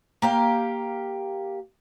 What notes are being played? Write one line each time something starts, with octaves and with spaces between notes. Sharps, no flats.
A#3 G4 F5